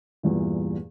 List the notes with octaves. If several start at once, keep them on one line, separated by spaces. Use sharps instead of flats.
E2 G2 A#2 E3